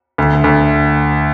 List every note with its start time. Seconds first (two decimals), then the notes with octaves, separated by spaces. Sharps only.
0.18 D2
0.44 D2